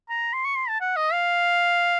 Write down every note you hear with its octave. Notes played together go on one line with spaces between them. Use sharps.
A#5
C6
C#6
C6
A5
F#5
D#5
F5